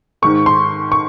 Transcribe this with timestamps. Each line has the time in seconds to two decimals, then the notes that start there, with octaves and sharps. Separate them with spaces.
0.22 G#2 D#3 G#3 C#6
0.46 C6
0.92 C#6